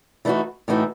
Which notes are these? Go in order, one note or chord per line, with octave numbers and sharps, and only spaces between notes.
E3 A3 D#4 F#4
A2 E3 A3 D#4 F#4